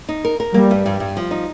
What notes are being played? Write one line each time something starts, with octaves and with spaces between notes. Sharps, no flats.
D#4
A#4
A#4
G3 A#3
G2
G2
G2
F3
D#4